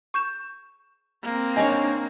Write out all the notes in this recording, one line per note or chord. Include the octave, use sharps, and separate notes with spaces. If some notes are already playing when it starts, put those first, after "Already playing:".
C#6 G6 E7
A#3 C4
D#2 D4 C#5 D#5 G#5 A#6